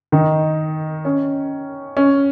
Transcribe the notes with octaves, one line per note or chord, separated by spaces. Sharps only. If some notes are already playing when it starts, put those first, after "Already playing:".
D#3 D#4
C#4
C#4